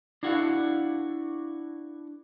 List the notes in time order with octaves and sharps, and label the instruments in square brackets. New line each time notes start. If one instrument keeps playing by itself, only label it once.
[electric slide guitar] D4 E4 F#4 A4 F5 F#5